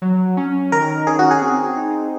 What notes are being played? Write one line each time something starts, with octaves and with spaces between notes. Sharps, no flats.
F#3
C#4
D#3 A#4
C#4 G#4
F#4
G#4
C4
D#4